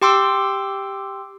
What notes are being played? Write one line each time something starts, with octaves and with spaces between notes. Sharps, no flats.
G4 G5 C6 D6 E6